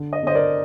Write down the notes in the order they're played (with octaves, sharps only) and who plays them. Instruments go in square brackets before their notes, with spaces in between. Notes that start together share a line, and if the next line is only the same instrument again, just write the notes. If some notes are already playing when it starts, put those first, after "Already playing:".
Already playing: [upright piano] D3
D#5
D3 C5 D#5
A#4 D5